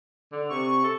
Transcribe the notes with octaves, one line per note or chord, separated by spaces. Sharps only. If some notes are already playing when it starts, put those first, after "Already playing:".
D3
C3 C#6
A4